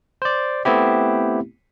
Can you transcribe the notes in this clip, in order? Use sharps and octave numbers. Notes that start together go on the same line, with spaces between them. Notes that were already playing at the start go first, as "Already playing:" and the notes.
C5 D5
A3 B3 C4 E4 G4